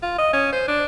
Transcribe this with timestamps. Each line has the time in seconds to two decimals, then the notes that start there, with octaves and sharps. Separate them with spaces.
0.02 F4
0.18 D#5
0.33 C#4
0.52 C5
0.68 D4